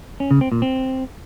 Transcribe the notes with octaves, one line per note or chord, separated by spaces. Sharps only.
C#4
C#3
C4
A#2
C4